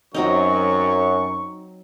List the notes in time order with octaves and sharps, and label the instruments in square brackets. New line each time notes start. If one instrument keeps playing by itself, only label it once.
[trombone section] F#2 [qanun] F#3 C4 D#4 [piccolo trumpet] C#6